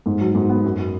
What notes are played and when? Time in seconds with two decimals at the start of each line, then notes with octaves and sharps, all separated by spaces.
0.06 G#2
0.20 F#3
0.35 G#2
0.49 B3
0.64 F#2